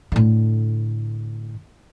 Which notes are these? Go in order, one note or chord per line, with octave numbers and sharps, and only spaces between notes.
A2 D3